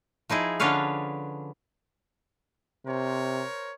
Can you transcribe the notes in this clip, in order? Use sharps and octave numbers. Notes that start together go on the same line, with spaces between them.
F3 D#4 E4 G#4
D3 C#4 D4 B4 C#5 F5
C3 A#4 C5 C#5